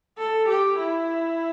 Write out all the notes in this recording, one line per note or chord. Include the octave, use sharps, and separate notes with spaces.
A4
G4
E4